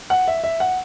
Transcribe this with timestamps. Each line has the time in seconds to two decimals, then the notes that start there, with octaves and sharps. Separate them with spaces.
0.10 F#5
0.28 E5
0.44 E5
0.60 F#5